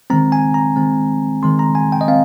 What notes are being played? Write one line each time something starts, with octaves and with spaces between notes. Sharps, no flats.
D#3 G#3 C4 A#5
G#5
A#5
D#3 G#3 C4
D#3 G#3 C4 C6
A#5
G#5
G5
D#5
C4 F5